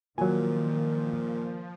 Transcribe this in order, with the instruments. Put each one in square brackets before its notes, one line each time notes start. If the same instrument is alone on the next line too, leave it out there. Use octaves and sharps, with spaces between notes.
[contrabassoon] A#2 [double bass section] D#3 [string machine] F3 [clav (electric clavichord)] F#3 G#5